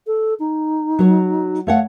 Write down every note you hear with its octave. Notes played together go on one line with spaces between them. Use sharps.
A4
D#4
F#3 C#5
A3 C#5 F5 F#5